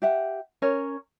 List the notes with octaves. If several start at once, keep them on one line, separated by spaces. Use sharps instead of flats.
G4 E5 F#5
C#4 A#4 C#5